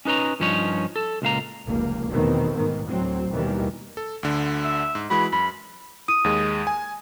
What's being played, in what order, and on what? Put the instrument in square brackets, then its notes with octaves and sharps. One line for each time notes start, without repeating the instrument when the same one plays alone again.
[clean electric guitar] C#4 D#4 B4 C#5 A#5
G2 F3 C#4 D#4 C#5
A4
C#2 A#2 F5 A#5
[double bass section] F1 C#2 A#3
E2 B2 D#3 A3 C4
G#2 B2 D#3
D2 A2 F#3 C4
D#2 B2 D#3 E3 G3
[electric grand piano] A4
D2 D3
[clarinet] E5
[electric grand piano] G#2
[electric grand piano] E3 G#3 F#4 [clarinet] B5
[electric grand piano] F#2 [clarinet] B5
[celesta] D#6 D#7
[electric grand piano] D#2 G#3
G#5